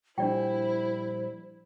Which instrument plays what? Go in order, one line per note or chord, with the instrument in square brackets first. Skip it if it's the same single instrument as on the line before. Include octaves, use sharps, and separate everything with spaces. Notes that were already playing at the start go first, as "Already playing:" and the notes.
[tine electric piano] A#2 F3 G3 [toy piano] D4 D5 G5 [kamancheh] E4 [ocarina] C5